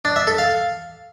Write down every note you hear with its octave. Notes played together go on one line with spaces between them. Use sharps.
D4
E5
A4
F5